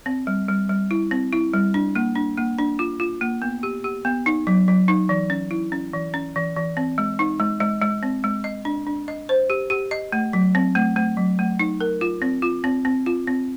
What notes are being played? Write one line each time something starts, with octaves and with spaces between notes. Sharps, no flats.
C4
G3
G3
G3
E4
C4
E4
G3
D4
A#3
D4
A#3
D4
F4
F4
A#3
B3
G4
G4
B3
D#4
F#3
F#3
D#4
E3
C#4
E4
C#4
E3
C#4
E3
E3
C4
G#3
D#4
G#3
G#3
G#3
C4
G#3
D#5
D4
D4
D#5
C5
G4
G4
D#5
A3
F#3
C4
A3
A3
F#3
A3
D#4
A#4
F4
C4
F4
C4
C4
F4
C4